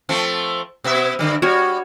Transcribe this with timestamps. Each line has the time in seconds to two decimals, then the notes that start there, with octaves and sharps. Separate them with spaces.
0.09 F3 A3 C4
0.84 B2 B3 E5
1.19 G2 D3 G3
1.42 G3 F#4 C#5